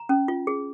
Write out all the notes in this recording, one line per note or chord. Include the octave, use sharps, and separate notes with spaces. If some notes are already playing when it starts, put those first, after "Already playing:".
Already playing: A#5
C#4
F4
G#4